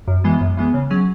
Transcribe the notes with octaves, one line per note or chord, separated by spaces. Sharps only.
F#2
E3 G#3 B3
F#2
E3 G#3 B3
C#3
F#3 C#4 G#4